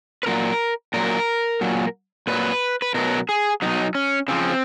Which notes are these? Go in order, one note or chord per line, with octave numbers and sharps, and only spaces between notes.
B4
A#2 F#3 A#4
A#2 F#3 A#4
A#2 F#3
A#2 F#3 B4
B4
B2 F#3 A#4
G#4
B2 F#3 D#4
C#4
C#3 F3 C4